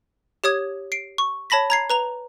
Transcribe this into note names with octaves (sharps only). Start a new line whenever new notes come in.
G4 C#5 D#6 G#6
C7 D7
C#6
C#5 A5 B5 A#6 B6
A#5 G#6 C7
B4 A#5 F7